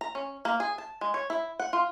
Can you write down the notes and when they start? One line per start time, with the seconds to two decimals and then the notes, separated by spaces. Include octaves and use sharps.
0.01 A#5
0.15 C#4
0.45 A#3
0.60 G#4
0.78 A5
1.01 G#3
1.14 C#5
1.30 E4
1.60 F#5
1.73 F4